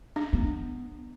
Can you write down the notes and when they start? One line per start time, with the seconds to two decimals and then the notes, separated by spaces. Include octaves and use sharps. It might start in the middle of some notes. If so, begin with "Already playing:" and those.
0.16 D4
0.33 B3